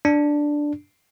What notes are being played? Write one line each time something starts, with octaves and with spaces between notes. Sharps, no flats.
D4